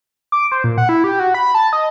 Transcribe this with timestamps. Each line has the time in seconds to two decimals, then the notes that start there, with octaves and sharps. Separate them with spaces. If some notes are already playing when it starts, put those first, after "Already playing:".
0.32 D6
0.52 C5
0.64 A#2
0.78 F#5
0.89 E4
1.04 G4
1.20 F#4
1.35 B5
1.55 A5
1.73 D#5